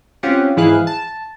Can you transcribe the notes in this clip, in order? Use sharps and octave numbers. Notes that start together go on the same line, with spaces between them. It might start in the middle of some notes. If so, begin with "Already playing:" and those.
C4 C#4 F4 G4 F#5
G#2 E3 E4 G#4 F5 F#6
A5